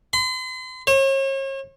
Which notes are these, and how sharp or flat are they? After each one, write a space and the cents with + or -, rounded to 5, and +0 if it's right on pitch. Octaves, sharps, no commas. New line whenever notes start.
C6 -40
C#5 -40